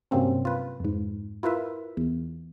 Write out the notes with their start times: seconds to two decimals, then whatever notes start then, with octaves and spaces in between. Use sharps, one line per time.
0.11 G2 C3 F#3 A#3 C4 C#4
0.45 F4 B4
0.80 F2 G#2
1.43 E4 F4 A#4 B4 E5
1.97 E2